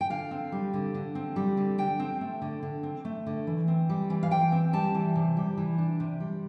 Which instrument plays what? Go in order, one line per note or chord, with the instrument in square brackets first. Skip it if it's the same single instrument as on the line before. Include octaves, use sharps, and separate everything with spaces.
[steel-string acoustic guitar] G5
D3 F5
C4
G3
D3
D3
C4
G3
D3
D3 G5
C4
A3
D3
D3
C4
A3
D3
E3
C4
G3
E3
F5
E3 G5
C4
G3 A5
E3
C3
G3
E3
D4
C3
G3